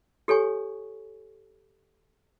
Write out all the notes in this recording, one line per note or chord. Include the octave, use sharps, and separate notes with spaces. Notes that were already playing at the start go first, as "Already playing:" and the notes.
G4 A4 C#5 G#5 C#6